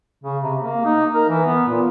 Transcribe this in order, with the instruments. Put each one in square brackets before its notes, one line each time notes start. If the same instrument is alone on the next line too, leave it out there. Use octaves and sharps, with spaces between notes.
[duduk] C#3
C3
A#3
D#4
A#4
E3
B3
A#2